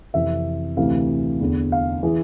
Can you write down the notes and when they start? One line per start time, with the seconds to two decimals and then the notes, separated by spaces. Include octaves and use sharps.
0.14 F2 C3 E3 E5
0.77 D2 C3 E3 F5
1.41 E2 D3
1.72 F5
2.03 E3 G#4